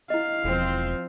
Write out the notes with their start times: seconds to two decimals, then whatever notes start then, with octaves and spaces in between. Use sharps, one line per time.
0.10 E4 D#5 F5
0.44 E1 F3 C4